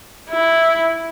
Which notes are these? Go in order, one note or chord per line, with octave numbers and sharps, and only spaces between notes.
E4